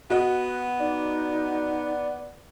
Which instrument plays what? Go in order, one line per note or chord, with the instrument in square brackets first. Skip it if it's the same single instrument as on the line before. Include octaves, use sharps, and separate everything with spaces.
[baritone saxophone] B3 [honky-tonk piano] F#4 D#5 [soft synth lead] F#5
[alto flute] D#4 [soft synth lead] D5